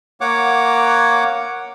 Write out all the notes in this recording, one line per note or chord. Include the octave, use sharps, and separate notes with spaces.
A#3 C#5 F#5 D6